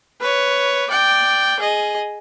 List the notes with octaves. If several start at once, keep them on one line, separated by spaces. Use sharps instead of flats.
B4 C#5
D5 G5
G#4 D#5